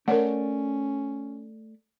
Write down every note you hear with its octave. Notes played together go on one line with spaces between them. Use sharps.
A3 C#4 A#4 C#5 D5 F#5